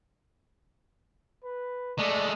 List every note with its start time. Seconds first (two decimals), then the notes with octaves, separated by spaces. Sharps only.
1.44 B4
1.99 G#3 A3 D5